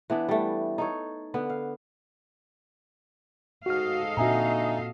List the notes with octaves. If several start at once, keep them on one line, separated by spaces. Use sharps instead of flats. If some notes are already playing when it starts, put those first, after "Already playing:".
E3 B3 D4
G3 A3
D#4 A4 C#5
D3 B3
F5
G#2 F#4 A4 D#5 F5 F6
A#2 D3 C4 D#4 F#4 E5 G#5 A#5